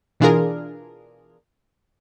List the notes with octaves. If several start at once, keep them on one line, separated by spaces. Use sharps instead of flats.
B2 E3 D4 F4 G#4 A#4